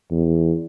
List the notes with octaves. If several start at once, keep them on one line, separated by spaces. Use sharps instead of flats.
E2